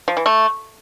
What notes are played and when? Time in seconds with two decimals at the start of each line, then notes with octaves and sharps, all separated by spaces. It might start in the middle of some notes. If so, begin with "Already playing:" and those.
0.08 F3
0.17 E3
0.26 A3